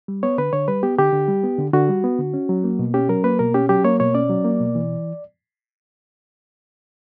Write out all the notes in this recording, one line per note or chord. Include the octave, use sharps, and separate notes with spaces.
G3
B3 C#5
D3 B4
D3 C#5
G3 B4
B3 G4
D3 G4
D3
G3
B3
D3
D3 F#4
G3
B3
D3
C#4
F#3
A#3
B2
C#4 G4
F#3 A#4
A#3 B4
B2 A#4
C#4 G4
F#3 G4
A#3 C#5
B2 C#5
C#4 D5
F#3
A#3
B2
E3